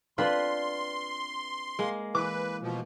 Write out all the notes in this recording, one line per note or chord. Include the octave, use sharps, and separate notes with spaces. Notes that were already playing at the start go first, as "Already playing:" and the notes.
C4 D4 F4 B4 C6
G#3 A#3
E3 B4 D6
B2 F3